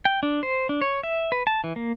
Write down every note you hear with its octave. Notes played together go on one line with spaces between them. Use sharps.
G5
D4
C5
D4
C#5
E5
B4
A5
E3
A#3